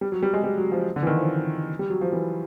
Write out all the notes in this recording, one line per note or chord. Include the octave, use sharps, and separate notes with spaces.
G3
F#3
G3
G#3
G3
F#3
F3
D3
E3
D#3
F3
G3
F#3
F3
E3